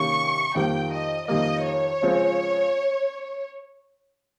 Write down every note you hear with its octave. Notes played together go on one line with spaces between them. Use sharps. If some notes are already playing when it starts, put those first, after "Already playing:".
Already playing: C3 D#3 A#3 C#4 G4 C#6
F2 D#3 G3 A#3 G5
D#5
F2 D#3 G3 A#3 D#5
C#5
C#3 F3 G#3 C4 F4